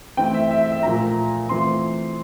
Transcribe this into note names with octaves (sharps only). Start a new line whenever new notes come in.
E3 A3 C4 E4 G5
E5
E5
E5
E5
A#2 F3 A3 A#5
E3 A3 C4 F4 C6